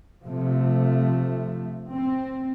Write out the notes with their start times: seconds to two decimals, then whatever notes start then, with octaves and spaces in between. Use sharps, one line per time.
0.24 C3 F3 A3
1.90 C4